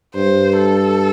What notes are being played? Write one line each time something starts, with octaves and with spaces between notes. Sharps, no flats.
G2 C5
A4